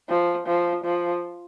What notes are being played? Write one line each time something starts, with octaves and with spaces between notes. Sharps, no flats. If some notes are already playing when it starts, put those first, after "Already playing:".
F3
F3
F3